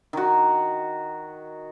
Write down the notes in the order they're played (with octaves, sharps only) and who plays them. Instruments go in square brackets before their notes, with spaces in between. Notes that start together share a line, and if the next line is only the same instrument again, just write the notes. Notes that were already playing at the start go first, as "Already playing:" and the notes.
[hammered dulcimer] D#3 F#4